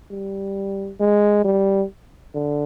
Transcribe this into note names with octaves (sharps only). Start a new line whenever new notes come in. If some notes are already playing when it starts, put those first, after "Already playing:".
G3
G#3
G3
D3